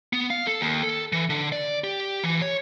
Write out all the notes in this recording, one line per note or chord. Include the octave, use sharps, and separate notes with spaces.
B3
F5
A4
D#2
A4
E3
D3
D5
G4
E3
C#5